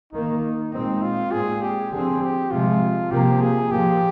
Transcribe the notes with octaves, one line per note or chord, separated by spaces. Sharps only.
D#3 A#3 D#4
A#2 G#3 C4 D#4
F4
A#2 G#3 C4 G#4
G4
D3 F3 C4 G#4
G4
C3 F3 G#3 F4
C3 F3 A#3 G4
G#4
A#2 F3 A#3 G4